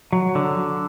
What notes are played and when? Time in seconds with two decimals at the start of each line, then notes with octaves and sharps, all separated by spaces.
0.13 F#3
0.35 D3